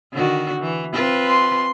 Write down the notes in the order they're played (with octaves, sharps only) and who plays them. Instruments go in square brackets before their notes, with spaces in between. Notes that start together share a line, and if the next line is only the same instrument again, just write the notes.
[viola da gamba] D3 D#3 F#4
E3
C4 F4 B4
[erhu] C6